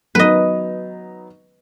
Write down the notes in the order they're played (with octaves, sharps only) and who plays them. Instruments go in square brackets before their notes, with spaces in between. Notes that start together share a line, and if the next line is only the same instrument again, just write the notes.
[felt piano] F#3 B3 D#4 [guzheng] B4 D#5